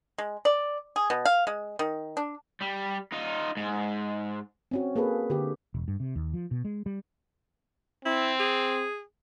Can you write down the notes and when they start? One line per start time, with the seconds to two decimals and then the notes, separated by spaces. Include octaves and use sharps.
0.18 G#3
0.45 D5
0.96 G#4
1.10 B2
1.25 F5
1.47 G#3
1.79 D#3
2.17 D4
2.61 G3
3.12 D#4 F4
3.57 G#2
4.71 C4 C#4 F#4
4.96 A#3 G#4 A4 B4
5.30 D3 G4
5.74 E1
5.88 G2
6.00 C3
6.16 D#2
6.33 F3
6.51 B2
6.65 G#3
6.86 G3
8.05 C4 E4
8.40 G#4